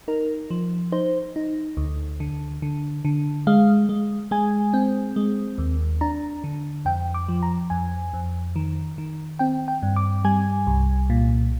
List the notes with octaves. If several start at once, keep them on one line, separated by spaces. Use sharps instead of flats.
D#4 A#4
F3
D#4 C5
D#4
D2
D3
D3
D3
G#3 F5
G#3
G#3 G#5
C4
G#3
D#2
D4 A#5
D3
F2 G5
D6
F3
A#5
F2 G#5
F2
D#3
D#3
C4 G5
G5
G2
D6
G3 G#5
C2
A#2